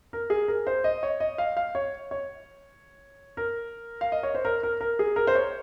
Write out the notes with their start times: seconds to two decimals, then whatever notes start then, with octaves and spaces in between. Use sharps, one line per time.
0.13 A#4
0.30 G#4
0.48 A#4
0.67 C5
0.84 D#5
1.03 C#5
1.20 D#5
1.38 F5
1.57 F5
1.75 C#5
2.11 C#5
3.37 A#4
4.01 F5
4.12 D#5
4.23 C#5
4.34 C5
4.45 A#4
4.63 A#4
4.81 A#4
4.99 G#4
5.16 A#4
5.27 C5
5.35 C#5